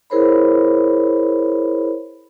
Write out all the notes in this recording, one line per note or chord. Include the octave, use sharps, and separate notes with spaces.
E4 G#4 A#4 C5 C#5 B5